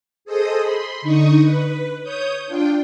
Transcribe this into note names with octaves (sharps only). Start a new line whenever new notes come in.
G#4 A4 C5 D#5 D#6
B5 C6
D3 D#4 C#6 D#6
B4
C#5 D#6 G6
D4 F4 G5